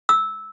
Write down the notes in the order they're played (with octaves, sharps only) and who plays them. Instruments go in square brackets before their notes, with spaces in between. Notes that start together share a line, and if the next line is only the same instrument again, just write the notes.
[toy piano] E6